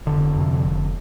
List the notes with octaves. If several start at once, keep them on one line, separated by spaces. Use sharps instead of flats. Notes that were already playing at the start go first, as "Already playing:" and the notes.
F1 D3
F2 C3
F1